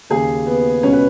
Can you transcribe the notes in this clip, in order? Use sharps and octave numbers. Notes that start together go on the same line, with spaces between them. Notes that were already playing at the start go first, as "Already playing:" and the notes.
D#2 C#3 G#4
B3
C#2 B2 C#4
B4